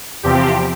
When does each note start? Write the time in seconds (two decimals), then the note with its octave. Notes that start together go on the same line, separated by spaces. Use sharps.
0.23 E2 C3 F3 C4 G4